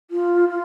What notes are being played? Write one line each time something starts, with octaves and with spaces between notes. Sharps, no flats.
F4
F4